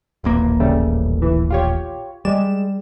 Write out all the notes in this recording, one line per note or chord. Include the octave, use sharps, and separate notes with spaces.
D#1 A1 A#3
C#3 G3 A3
E3
F4 G4 C#5
G3 G#3 E7